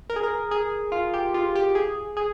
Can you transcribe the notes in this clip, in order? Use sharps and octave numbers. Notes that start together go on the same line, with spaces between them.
A#4
G#4
A#4
G#4
F4
G4
F4
G4
G#4
G#4